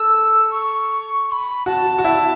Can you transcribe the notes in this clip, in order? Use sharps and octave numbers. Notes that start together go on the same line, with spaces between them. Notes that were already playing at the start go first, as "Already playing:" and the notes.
Already playing: A4 E6
C#6
C#6
B5
F#4 A5
F#4
E4